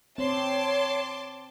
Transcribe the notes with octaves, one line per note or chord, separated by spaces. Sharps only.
C4 C#5 A5 C6 D6